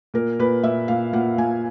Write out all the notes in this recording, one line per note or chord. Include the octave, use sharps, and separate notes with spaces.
A#2 A#4
A#2 B4
A#2 E5
A#2 F5
A#2 F#5
A#2 G#5